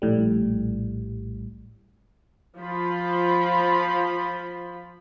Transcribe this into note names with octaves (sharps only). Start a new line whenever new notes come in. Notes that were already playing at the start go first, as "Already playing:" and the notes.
A#1 A2 G3
F3 F4 B5